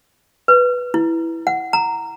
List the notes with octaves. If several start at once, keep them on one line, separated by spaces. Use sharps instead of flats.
B4
E4
F#5
A#5